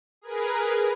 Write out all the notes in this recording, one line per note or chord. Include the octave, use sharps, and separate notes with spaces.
G#4 A#4 B4